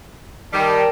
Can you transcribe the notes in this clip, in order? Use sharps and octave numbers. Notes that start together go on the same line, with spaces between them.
D#3 G3 A#4 G5 A5